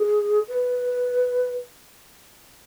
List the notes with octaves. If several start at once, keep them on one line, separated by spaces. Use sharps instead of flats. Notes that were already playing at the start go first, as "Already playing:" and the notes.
Already playing: G#4
B4